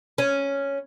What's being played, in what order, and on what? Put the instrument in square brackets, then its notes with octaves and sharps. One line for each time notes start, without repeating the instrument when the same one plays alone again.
[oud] C#4